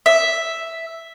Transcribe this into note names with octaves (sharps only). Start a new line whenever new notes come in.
E5